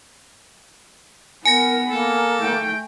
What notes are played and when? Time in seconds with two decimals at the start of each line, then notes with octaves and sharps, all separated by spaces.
1.45 B3 A#4 G#5 A#6
1.90 A#3 A4
2.38 A3 G5